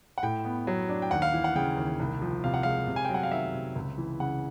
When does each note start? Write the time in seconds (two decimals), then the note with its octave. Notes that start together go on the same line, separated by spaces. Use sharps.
0.18 F#5
0.23 A2 G5
0.45 B3
0.67 F#3
0.89 D4
1.02 G5
1.11 D#2 F#5
1.22 F5
1.33 E3
1.44 F#5
1.56 C#3 G5
1.77 D#2
1.99 C2
2.22 F3
2.44 C3 F5
2.54 F#5
2.63 G#3 F5
2.87 C3
2.96 G#5
3.05 G5
3.09 F#3
3.14 F#5
3.23 F5
3.32 D#3 E5
3.54 C3
3.76 C#2
3.98 E3
4.20 C#3 F#5